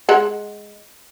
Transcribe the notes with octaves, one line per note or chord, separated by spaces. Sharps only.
G#3 F#5